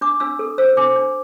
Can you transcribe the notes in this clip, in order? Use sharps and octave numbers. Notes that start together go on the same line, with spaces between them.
D4 D6
D4 E6
A4
C5 E6
D4 D6
D4